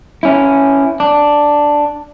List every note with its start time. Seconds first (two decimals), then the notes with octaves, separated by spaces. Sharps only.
0.23 C#4 E4
1.00 D4